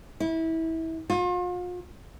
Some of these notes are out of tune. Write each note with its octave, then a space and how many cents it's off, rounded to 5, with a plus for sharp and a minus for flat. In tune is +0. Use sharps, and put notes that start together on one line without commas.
E4 -25
F4 +40